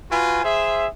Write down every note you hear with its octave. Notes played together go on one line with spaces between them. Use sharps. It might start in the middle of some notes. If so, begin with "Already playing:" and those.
F4 F#4 B4 G#5
G#4 C5 E5